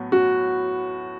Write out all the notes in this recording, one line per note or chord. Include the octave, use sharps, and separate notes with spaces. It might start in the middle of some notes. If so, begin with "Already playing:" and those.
Already playing: A2 F#3 B3
F#4